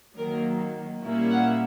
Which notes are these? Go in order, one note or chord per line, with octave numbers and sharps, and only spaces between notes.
D#3 F#3 A#3 A#4
A#2 G3 A#3 C#4 E4
F#5